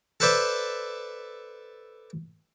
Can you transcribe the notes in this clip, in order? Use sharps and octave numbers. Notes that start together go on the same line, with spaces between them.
A4 B4 C5 D5 E5